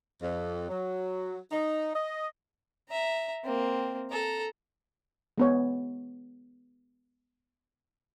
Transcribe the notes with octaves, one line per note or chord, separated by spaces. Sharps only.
F2
F#3
D#4
D#5
E5 A#5
A#3 C4
A4 A#5
G#3 B3 C#5